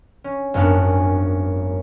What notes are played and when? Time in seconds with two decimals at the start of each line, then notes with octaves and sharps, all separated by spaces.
0.24 C#4
0.54 G#1 F#2 B3 D4 F5 A5